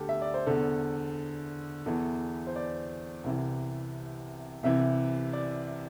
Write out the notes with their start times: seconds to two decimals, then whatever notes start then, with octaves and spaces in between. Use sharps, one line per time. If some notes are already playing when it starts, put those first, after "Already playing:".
Already playing: D2 D3 G4 A4
0.09 E5
0.22 D5
0.34 C5
0.46 E2 D3 A4
1.86 E2 E3 A4
2.47 C5
2.56 D5
3.24 C2 C3 E3
4.63 C2 C3 E3 E5
5.33 D5